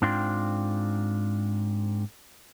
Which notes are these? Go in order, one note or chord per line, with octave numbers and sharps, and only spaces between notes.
G#2 C4 D4 F4 G5 C6